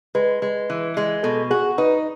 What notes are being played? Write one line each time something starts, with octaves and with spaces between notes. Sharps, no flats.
G#3 B4
G#3
E3
G#3
B2 A4
F#4 G#4
D#4 B4